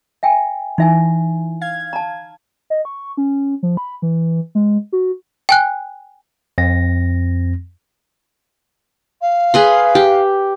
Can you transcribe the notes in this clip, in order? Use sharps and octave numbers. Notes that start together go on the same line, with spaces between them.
E5 G5 G#5
E3 D#4 E5 G#5
F5 G#6
A5 A#5
D#5
C#6
C#4
F3
B5
E3
G#3
F#4
G5 G#5 F#6
F2 C4 A#6
F5
G#4 B4 C6
G4